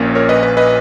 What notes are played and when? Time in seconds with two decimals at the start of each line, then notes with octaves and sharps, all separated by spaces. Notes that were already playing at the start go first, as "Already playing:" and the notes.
Already playing: A#1 A#2 A#3 C#4
0.15 A#4 C#5
0.29 B4 D#5
0.43 B4
0.57 B4 D#5